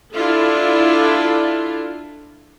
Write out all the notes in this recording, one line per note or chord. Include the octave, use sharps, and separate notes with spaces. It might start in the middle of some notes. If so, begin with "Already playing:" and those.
D4 E4 F4 A4